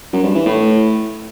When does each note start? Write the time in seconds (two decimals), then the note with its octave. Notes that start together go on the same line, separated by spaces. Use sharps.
0.13 F#2
0.24 G2
0.35 E3
0.46 A2